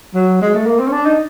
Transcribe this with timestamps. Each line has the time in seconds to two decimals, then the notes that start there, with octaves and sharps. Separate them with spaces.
0.15 F#3
0.41 G#3
0.54 A3
0.67 A#3
0.79 C4
0.87 C#4
0.92 D4
1.06 D#4